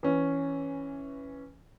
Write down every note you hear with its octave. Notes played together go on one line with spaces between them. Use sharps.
E3 C#4